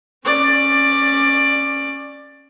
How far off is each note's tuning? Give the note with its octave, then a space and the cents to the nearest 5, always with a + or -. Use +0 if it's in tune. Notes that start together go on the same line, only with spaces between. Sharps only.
C#4 -10 D5 +15